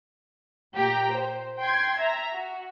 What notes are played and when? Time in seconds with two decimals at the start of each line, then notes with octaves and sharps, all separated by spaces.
0.76 A#2 G4 G5 A#5
1.16 C5
1.59 G5 C6 G#6
1.97 E5 A#5
2.33 F#4